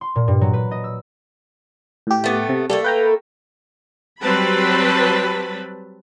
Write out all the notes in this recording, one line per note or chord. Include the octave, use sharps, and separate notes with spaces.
C6
A#2
G2
F#3
B4
D#5
E6
A2 G4
A3 B3
C3
G3 A3 A#3 A4
B4 G5 A#5
F#3 G3 C4 B4 A5 B5